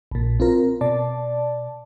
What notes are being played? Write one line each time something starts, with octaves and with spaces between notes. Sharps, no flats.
A#1 A#2
C4 F4 A#4
B2 D5 A5